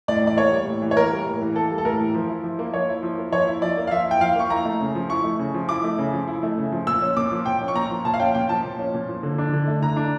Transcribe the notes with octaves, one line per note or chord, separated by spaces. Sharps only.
A2 D5
E3 D5
A#3 C#5
G3
A2
E3
C#5
A#3 A#4
G3
A2
E3
A#3 A4
G3
A4
A2 A#4
E3
F3
E4
F3
A#3
F3 C#5
E4
F3
A#3
F3 C#5
E4
F3 D5
A#3
F5
F3 E5
E4 G5
F3 F5
A#3 C#6
E4 A#5
A3
C#3
F3
E4 C#6
A3
C#3
F3
E4 D6
A3
C#3
F3
E4
A3
C#3
F3
A#2 E6
C#4
A#2 D6
F3
A#2 G5
C#4
C#6
A#2 A#5
F3
A#2 A5
F5
C#4 G5
A#2 G5
F3 A5
A#2
C#4
A#2
F3
D3
D4
D3
A3
D3 A#5
D4